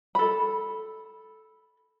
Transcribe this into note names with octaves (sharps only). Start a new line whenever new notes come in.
A4 B5